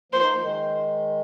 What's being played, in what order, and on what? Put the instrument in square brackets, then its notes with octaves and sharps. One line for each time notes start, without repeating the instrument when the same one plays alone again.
[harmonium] F3 A#3 [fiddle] C5
[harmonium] A#3 D#4
F3
D#3 G#3